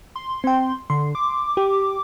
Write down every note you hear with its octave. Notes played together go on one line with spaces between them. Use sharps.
C6
C4 G5
D3 C6
D6
G4